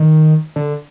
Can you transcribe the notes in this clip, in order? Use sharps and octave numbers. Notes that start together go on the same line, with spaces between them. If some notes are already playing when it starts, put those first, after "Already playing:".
Already playing: D#3
D3